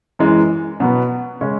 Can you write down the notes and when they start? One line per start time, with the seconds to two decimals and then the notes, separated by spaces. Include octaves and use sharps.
0.19 F#2 E3 G#3
0.80 B2 F#3 B3
1.41 C#3 G#3 C#4